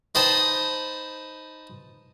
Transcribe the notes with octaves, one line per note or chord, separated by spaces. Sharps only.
D#4 B4 C5 D#5 G5 A5